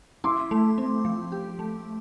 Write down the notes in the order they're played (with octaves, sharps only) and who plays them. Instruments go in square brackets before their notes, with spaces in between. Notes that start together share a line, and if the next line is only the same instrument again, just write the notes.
[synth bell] E4 [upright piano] C6 D6
[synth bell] A3
C4
F3
G4
A3